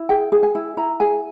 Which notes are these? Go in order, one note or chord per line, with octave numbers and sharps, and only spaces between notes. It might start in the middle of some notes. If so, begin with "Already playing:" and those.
Already playing: E4
G#4 G5
G#4
G#5
E4
E4 A#5
G#4 G#5